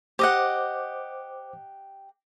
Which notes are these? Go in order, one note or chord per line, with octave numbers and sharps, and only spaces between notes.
G4 C5 D#5 F#5 D6